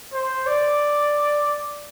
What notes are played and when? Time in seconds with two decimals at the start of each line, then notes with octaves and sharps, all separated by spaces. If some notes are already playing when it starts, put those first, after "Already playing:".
0.13 C5
0.47 D5